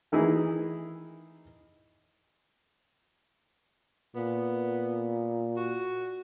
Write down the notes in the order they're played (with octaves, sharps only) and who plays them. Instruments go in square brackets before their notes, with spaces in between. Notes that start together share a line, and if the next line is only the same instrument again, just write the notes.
[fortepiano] D#3 E3 D#4 E4 G#4
[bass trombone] A#2 [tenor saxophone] B3
[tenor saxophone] F#4